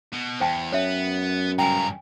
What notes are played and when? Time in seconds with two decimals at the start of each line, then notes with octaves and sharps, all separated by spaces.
0.13 B2
0.40 E2 C5 G5 A5
0.72 F#2 B3 C#5 E5
1.59 G2 C#3 G5 G#5 A#5